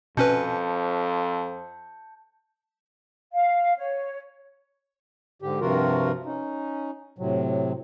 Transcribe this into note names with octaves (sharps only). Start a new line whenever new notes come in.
F2 B2 C#4 B4 A5 G6 C#7
F5
C#5
G#2 D3 G4
G2 C3 F3 F4 F#4 A#4
C#4 D#4
A2 C3 F#3